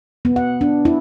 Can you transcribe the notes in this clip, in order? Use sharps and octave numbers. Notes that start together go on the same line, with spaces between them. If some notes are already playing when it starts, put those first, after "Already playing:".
B3
F#5
D4
E4